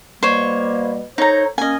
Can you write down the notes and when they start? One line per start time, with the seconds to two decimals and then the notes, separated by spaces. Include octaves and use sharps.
0.23 B2 G3 A#3 C5 C#5
1.18 D#4 A4 C5 C#5 A#5
1.58 A#3 C#4 D#5 G#5